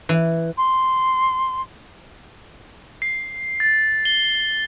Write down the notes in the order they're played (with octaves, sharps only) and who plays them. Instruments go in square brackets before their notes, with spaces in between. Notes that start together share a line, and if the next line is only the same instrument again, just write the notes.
[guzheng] E3
[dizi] C6
[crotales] C7
A6
G7